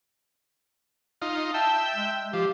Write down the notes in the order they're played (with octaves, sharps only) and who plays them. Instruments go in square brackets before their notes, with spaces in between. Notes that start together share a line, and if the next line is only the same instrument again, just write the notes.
[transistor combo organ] D#4 F4
[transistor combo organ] E5 G5 [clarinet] A5
[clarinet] G#3
[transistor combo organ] F3 [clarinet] G4